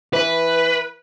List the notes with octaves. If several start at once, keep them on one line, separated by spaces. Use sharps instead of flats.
E3 B4